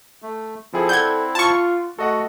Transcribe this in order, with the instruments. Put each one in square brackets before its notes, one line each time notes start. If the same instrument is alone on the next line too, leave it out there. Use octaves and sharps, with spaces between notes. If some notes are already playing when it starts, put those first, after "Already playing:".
[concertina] A3
[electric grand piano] F3 G#4 A4 [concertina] C4 E4
[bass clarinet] A4 [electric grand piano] D5 F#5 [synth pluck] G6 G#6
[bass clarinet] F4 [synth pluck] A5 C#6
[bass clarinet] A3 [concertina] F#4 [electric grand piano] A4 D#5 F#5